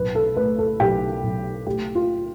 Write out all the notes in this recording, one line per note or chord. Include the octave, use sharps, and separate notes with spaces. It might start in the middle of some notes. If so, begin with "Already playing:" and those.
Already playing: B1 B4
A4
A3 B4
A4
B1 G4
B1
A3 G4
F4